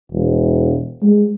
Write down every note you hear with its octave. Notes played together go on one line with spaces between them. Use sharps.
E1
G#3